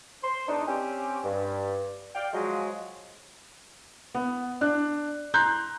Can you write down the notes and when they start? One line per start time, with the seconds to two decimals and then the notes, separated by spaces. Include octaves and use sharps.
0.23 C5 C6
0.48 E2 D4 D#4
0.67 C4 C#4 G4
1.24 G2
2.15 D5 F5 G5
2.33 F3 F#3 G#3
4.15 B3
4.61 D4 F#6
5.34 A#5 C6 F#6 G6